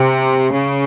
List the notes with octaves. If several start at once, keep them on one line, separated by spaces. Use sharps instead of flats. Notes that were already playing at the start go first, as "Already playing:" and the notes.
Already playing: C3
C#3